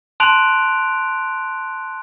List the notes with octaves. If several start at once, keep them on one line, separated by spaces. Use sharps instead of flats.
A5 C6 F#6 D7 F7